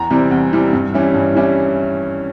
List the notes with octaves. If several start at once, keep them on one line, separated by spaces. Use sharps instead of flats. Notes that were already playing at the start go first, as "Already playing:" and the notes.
Already playing: E2 A#5
C3 E3 G3 C4
E2
C3 E3 G3 C4
G2
E3 G3 C#4 E4
G2
E3 G3 C#4 E4